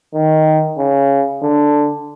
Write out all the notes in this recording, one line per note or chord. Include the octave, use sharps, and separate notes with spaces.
D#3
C#3
D3